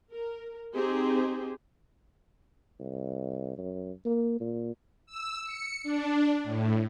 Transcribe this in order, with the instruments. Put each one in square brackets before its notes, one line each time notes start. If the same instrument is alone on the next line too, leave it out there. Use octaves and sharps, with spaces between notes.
[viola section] A#4
C4 D#4 G4 G#4 C5
[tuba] C2
F#2
A#3
A#2
[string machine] E6
C#7
D4
A2